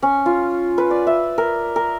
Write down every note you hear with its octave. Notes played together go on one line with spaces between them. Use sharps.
C#4
F4
B4
D5
E5
A#4
A#4